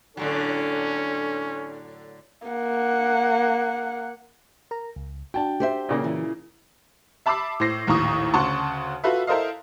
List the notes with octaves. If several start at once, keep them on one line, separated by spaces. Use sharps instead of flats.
A2 D3 F#3 C#4 D4 A4
A#3 F#5
A#4 A#5
C#2
D4 F#4 G5 A5
G4 C5 E5
A#2 C#3 A#3
E3
E5 A5 B5 D6 E6 C7
A2 C5 A#6 C7
A#1 D#2 A2 A#5 C#6 D#6
D2 C#3 F#5 A5 C6 C#6
F4 F#4 A4 B4 E5
E4 A4 A#4 C5 D#5 F5